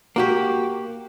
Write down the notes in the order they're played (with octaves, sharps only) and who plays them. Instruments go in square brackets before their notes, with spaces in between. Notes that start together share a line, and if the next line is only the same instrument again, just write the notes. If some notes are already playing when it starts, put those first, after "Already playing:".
[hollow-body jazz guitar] A#3 F#4 G4